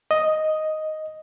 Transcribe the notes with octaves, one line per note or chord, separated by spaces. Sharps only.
D#5